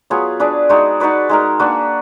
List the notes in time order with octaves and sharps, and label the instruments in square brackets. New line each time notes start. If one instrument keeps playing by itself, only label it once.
[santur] F#3 B3 F4 G#4
D4 G#4 B4 D5
G#3 D#4 F#4 D5
D#4 F#4 B4 D5
G#3 D#4 A#4
A#3 D4 F#4 B4